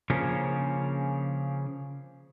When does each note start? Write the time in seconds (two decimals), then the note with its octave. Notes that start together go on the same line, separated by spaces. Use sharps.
0.10 C#3 F3 A#3 C#4 D4